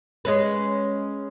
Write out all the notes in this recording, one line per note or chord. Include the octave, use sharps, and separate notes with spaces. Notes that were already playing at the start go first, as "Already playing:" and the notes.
G#3 C#4 B4